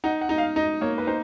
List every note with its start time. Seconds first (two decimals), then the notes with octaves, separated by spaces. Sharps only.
0.04 D#4 F#5
0.21 F#5
0.29 D#4
0.38 F5
0.56 D#4 D#5
0.81 A#3 C#5
0.98 B4
1.07 D#4 C5